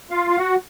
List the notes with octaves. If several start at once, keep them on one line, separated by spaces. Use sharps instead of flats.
F4 F5
F5
F#4 F#5